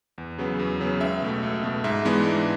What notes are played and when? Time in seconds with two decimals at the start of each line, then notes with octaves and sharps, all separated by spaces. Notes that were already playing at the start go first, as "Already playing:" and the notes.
0.18 E2
0.38 C#3 F#3 B3
0.59 E2
0.81 C#3 F#3 B3
1.01 C#2 E5
1.22 B2 A3
1.43 C#2
1.63 B2 A3
1.84 G#2 E5
2.05 E3 G#3 B3 D4
2.26 G#2